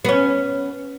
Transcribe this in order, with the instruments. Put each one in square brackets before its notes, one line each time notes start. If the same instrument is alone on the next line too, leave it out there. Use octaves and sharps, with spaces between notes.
[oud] B3 C#4